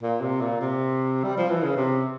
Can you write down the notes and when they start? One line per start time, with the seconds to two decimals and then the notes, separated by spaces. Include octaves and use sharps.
0.03 A#2
0.21 C3
0.41 A#2
0.61 C3
1.24 G3
1.37 F3
1.50 E3
1.64 C#3
1.77 C3